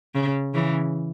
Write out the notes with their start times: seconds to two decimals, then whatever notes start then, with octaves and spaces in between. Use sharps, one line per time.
0.15 C#3
0.54 C#3 E3